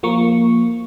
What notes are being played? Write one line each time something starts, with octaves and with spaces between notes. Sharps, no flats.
F3 A#3 C#6